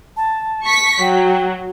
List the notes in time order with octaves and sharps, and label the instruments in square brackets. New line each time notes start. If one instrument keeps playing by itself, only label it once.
[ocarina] A5
[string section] C#6 B6
[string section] F#3 [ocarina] G5